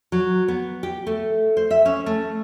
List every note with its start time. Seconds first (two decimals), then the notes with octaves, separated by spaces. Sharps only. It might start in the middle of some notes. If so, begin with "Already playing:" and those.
0.12 F#3
0.48 B3
0.83 G4
1.07 A3
1.57 C5
1.71 E5
1.86 C#4
2.06 A3